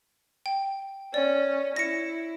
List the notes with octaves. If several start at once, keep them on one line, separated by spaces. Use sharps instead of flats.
G5
C#4 D5
E4 A#6 C#7